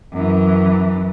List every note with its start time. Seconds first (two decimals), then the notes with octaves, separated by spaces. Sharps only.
0.13 F#2 E3